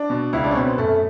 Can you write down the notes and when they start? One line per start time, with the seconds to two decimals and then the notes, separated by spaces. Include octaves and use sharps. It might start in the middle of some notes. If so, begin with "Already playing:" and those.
Already playing: D4
0.10 B2
0.33 C#2 E4
0.44 D4
0.51 C#4
0.55 B2 C4
0.67 B3
0.78 F#2 A3